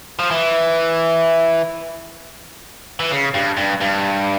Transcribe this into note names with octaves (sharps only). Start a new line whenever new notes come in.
F3
E3
E3
C#3
G2
G2
G2